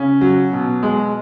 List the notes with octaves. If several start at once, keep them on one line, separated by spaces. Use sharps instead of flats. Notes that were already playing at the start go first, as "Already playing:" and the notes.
Already playing: C#3 C#4
F#3
B2
G#3